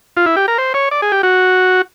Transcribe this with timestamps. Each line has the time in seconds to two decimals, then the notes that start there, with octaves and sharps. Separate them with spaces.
0.17 F4
0.26 E4
0.36 G4
0.48 A#4
0.58 C5
0.74 C#5
0.91 D5
1.02 G#4
1.12 G4
1.23 F#4